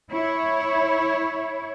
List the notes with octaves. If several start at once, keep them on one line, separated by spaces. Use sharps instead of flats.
E4 C#5